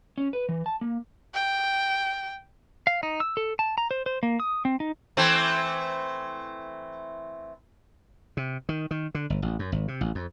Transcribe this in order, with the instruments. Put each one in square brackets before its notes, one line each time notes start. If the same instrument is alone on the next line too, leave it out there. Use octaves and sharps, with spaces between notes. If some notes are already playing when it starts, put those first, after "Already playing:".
[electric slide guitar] C#4
B4
E3
A5
A#3
[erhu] G5
[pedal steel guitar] F5
D#4
E6
A4
A5
A#5
C5
C5
A#3
D#6
C4
D#4
[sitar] E3 A3 C4
[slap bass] C3
D#3
D#3
D3
G1
A1
F#2
G#1
C3
A1
F2